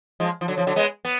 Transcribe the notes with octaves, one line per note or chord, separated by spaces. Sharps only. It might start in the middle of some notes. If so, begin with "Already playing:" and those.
F3 G#3
F3
D3 F#3
C#3 F3
D3 F#3
G#3 B3
B3